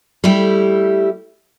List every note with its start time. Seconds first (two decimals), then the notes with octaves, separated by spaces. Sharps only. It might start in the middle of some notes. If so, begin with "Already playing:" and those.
0.24 G3 A3 E4 G4